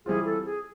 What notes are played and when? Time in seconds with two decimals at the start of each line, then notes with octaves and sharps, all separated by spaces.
0.06 E3 G3 C4 F4 G#4
0.25 A4
0.45 G#4